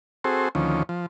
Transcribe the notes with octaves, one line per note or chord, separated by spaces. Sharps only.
C4 F#4 G#4 A4 C5
D2 D#3 F3 C#4
F3